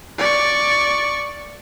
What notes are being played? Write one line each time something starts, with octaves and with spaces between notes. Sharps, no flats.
D5 C#6